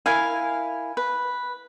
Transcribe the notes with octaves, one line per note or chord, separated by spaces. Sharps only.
E4 A#4 F5 G#5
B4